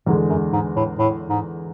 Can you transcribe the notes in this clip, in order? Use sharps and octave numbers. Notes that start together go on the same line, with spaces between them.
E2 G#2 D3 G#3
F#2
G#2
A2
A2
G#2